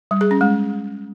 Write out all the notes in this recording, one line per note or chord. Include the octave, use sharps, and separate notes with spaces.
G3
G#4
C#4
G#3